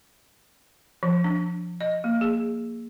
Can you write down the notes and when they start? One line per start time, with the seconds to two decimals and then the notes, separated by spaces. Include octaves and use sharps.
1.03 F3
1.24 D4
1.81 D#5
2.04 A#3
2.21 G#4